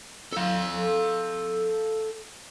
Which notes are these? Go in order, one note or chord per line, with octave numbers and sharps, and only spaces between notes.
A4 F5